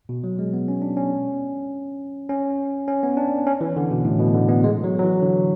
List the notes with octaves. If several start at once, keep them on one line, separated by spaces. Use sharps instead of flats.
B2
F#3
G#3
B3
C#4
D4
C#4
C#4
C#4
B3
D4
C#4
E3
D3
B2
A2
B2
D3
B3
G#3
F#3
F#3
E3
D3